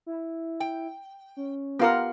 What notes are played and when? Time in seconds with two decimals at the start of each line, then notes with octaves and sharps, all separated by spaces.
0.06 E4
0.60 G5
1.37 C#4
1.79 B3 F4 G4 A#4 F5 F#5